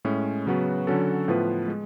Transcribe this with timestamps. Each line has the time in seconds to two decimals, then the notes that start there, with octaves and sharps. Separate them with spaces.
0.05 A2 G#3 C#4
0.46 C#3 F#3 B3 F#4 B4
0.87 D3 F#3 C#4 F#4 A4
1.28 A2 F3 B3 F4 B4
1.68 G#3